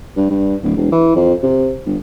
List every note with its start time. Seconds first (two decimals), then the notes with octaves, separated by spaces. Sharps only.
0.16 G2
0.29 G2
0.63 D1
0.76 E1
0.92 E3
1.16 F2
1.43 C3
1.86 G1